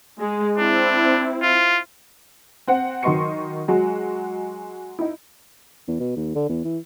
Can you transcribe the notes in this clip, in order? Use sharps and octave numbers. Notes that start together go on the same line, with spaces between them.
G#3
C4 D4 E4
F4
C4 C5 F#5
D#3 F#3 D#5 C6 C#6 C#7
F#3 G#3 F#4
D#4 E4
E2
B2
D#2
D3
E2
E3